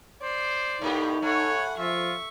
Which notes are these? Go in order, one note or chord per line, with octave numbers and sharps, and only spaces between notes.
C5 D5
A2 A#3 D#4 G4
A3 C#5 F#5 G#5 B5
F3 F4 E5 C#6